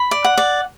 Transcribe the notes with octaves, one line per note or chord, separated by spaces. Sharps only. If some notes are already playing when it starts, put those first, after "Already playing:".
Already playing: B5
D5
F#5
D5